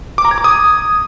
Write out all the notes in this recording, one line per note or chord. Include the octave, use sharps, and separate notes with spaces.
D6
A#5
G#6
D6
D#6